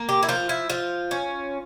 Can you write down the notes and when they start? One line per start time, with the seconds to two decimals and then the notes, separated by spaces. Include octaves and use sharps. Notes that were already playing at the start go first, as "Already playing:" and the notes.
Already playing: A#3
0.09 G4
0.23 E4
0.29 F3 F4
0.49 E4
0.70 F3 F4
1.11 C#4